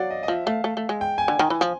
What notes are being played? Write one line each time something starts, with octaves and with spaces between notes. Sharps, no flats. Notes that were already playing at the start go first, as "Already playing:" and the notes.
Already playing: F#3 D5 F5
D#5
D#5
F3 E5
A3 F5
A3
A3
G#3
G5
G#5
D3
D#3
E3
F3